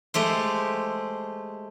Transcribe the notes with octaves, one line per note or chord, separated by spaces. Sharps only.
G#3 A3 G4 C5